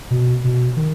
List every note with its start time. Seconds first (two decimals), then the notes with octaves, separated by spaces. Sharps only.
0.11 B2
0.44 B2
0.77 D#3